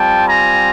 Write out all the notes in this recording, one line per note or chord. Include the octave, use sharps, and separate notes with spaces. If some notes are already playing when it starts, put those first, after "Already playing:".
Already playing: G3 C4 F4 G5 A5
G#5 A#5